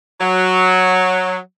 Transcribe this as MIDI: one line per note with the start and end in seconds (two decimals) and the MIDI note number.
0.21 1.37 54